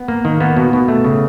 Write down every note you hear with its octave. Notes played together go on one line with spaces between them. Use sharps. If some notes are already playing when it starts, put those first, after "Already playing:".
Already playing: B3
A#3
D#3
A#3 B3
B2
B2
A3
C#3